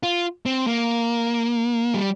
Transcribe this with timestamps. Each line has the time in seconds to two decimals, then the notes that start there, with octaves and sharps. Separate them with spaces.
0.03 F4
0.46 C4
0.67 A#3
1.94 G3